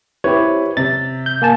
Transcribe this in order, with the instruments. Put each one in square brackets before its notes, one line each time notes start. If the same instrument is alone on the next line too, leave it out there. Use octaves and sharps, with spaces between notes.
[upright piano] C4 E4 B4 [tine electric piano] G4 C#5
[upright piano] C3 [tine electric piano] A6
[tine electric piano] G6
A#3 G#5 A5